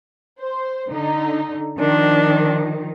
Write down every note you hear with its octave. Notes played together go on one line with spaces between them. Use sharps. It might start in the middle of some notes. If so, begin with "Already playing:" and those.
C5
D3 D#4
D#3 F3 D4